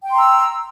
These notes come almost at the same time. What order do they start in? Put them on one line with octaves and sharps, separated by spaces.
G5 C6 A#5 E6